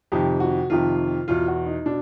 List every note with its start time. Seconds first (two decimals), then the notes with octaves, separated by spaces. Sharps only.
0.12 F2 C3 D#3 G4
0.40 F#4
0.70 F2 C3 D#3 F4
1.28 E2 B2 F4
1.48 F#4
1.66 D#4
1.86 B2 D4